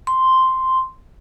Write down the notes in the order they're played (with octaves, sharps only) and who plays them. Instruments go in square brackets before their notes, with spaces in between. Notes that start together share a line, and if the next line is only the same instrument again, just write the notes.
[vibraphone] C6